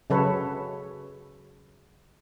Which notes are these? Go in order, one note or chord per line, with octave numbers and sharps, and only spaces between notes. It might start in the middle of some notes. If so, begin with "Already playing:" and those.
C#3 F#3 A4 B4 C#5